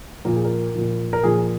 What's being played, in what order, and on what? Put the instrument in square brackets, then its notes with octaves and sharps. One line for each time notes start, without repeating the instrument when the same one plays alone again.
[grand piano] A#2 F3 A#4
G#4
A#4
A#2 F3
A#4
A#2 F3 G#4